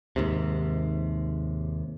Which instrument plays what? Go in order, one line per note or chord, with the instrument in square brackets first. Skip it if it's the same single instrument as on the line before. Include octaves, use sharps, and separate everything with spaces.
[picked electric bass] D#2 G#2 C3